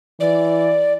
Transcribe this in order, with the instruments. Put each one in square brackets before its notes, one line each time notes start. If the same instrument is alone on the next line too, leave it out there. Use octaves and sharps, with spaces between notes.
[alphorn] E3 [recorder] D5